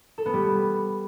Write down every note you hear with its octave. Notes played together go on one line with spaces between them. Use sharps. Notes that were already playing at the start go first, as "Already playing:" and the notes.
A4
B3
G3